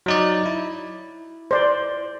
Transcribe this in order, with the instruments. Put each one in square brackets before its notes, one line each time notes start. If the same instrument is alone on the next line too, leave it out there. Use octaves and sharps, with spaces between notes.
[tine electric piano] F#3 D#4 D5
E4
[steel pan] C5 D5